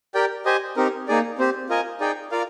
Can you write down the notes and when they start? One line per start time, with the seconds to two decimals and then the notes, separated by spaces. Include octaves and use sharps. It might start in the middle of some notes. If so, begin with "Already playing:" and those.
0.14 G4 A#4 D5 G5
0.45 G4 C5 D#5 G#5
0.77 C4 D#4 G4 A#4
1.08 A#3 D#4 G#4 D5
1.39 C4 G4 C5
1.69 F4 A#4 D#5 G#5
2.00 D#4 G#4 D5 G5
2.31 F4 A#4 D5 F5